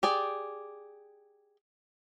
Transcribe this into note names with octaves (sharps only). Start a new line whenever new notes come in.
G4 G#4 D5